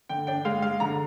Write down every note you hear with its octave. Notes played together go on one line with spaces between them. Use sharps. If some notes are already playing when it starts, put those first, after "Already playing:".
D3 G5
D4 G5
G#3 F5
G#3 F5
D3 A#5